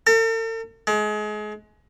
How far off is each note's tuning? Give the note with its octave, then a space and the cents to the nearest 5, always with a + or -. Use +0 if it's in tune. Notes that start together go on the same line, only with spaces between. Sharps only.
A4 +45
G#3 +30